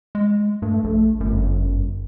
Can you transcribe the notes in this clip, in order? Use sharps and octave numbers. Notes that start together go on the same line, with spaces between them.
G#3
G2 A3
A#1
G1 F#2